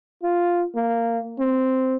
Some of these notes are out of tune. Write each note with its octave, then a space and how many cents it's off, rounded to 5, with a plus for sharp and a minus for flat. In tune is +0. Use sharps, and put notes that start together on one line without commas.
F4 +0
A#3 -10
C4 -5